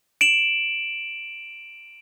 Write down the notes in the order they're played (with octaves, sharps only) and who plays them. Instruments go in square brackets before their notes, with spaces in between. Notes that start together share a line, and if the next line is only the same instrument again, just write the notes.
[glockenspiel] D7 E7 F#7